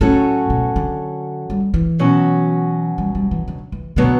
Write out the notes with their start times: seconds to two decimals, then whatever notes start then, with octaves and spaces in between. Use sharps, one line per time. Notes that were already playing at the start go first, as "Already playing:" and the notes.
0.01 A2 F#3 C#4 F#4 A4
0.50 B2
0.76 D3
1.50 G3
1.74 E3
1.99 B2 F#3 C#4 F#4
2.98 G3
3.15 G3
3.31 E3
3.48 D3
3.72 E3
3.96 B2 D3 F#3 B3